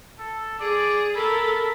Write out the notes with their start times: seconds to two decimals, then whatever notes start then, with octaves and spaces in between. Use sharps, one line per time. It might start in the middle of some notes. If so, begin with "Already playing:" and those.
0.19 A4
0.60 G#4 D5
1.16 A4 A#4 B5